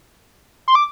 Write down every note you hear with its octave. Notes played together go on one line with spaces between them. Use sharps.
C6
D6